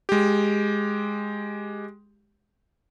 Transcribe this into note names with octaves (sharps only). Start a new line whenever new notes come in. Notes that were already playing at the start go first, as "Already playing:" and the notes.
G#3 G4